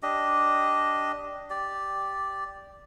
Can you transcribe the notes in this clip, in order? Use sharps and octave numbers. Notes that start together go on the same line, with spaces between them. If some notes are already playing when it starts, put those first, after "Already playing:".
D4 G4 D#5
G4 D5